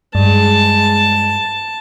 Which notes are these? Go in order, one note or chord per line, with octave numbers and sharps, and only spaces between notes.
G2 G#3 A5